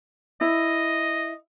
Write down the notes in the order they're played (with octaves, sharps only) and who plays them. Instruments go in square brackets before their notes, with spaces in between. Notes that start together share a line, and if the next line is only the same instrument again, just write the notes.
[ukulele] E4 [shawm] D#5